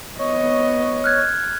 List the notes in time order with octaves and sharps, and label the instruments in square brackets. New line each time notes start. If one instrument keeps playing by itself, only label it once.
[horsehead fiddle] B3 D#5 [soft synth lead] C#5
[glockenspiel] F6 F#6 G#6